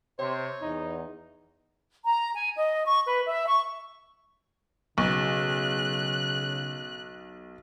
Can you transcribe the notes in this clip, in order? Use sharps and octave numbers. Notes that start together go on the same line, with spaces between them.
C3 C5 C#5
E2 D#4
A#5
G#5
D#5
C#6
B4
E5
C#6
B1 C#3 F#6